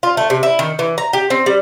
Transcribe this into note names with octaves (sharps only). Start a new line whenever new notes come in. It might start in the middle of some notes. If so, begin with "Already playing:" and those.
F4
A3
C3
E4
D#3
E3
A#5
G4
C4
G3